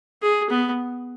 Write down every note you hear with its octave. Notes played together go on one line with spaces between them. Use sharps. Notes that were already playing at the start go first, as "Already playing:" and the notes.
G#4
B3